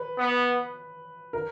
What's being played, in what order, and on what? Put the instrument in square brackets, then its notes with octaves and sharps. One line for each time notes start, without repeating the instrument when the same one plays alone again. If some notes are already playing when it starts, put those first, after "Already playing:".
Already playing: [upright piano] B4
[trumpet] B3
[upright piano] A#4